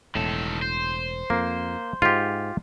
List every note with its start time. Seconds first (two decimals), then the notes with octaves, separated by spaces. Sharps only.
0.15 E1 A2 D#3 A4
0.62 C5
1.30 F2 A#3
2.02 G#2 F4 G4